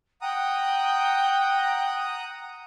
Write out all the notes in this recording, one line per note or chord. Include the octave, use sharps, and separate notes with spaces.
F#5 G5 A#5 D#6